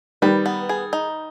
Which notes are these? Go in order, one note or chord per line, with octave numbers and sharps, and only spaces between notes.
D#3 G3 B4
B3
G#4
D#4